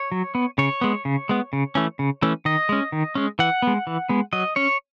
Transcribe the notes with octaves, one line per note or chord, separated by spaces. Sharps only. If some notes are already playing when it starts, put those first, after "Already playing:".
Already playing: C#5
F#3
B3
C#3 C#5
G#3 B3
C#3
G#3 B3
C#3
E3 A3 C#4
C#3
E3 A3 C#4
D#3 D#5
G#3 C#4
D#3
G#3 C#4
E3 F#5
G#3 B3
E3
G#3 B3
F#3 D#5
C#4 C#5